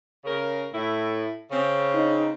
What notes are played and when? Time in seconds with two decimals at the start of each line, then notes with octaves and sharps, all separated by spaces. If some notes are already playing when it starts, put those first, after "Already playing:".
0.24 C#3 A#4
0.73 A2 E4
1.51 C#3 C4
1.95 D#4